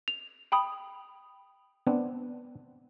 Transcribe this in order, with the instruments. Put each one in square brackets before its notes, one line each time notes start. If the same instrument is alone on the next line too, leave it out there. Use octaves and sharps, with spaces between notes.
[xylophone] F7
G5 B5 D#6
[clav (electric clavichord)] B3 C4 D4